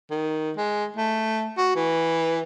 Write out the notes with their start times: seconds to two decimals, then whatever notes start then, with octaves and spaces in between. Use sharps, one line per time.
0.11 D#3
0.57 G#3
0.96 A3
1.57 F#4
1.76 E3